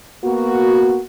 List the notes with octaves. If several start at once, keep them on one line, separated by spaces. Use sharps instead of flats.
A#3 B3 F#4